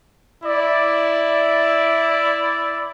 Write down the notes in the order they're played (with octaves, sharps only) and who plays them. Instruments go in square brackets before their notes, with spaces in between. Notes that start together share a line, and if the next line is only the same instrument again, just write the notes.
[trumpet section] E4 D5